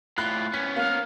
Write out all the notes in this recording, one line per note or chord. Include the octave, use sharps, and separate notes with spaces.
A2 F4 B5 F#6
B3 C#4 B6
A#3 F5